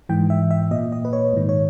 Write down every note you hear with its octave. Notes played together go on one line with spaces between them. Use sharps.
G#2 E3 G5
E5
E5
A#2 D#5
D#5
B4
C#5
G#2 D#3
C#5